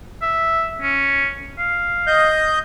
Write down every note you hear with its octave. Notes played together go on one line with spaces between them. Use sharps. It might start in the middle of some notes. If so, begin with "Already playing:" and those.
E5
C#4
F5
D#5 G6